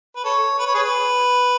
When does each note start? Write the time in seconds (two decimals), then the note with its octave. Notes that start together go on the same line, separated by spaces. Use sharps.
0.16 B4
0.25 A4 C#5
0.59 B4
0.67 C#5
0.75 G#4 B4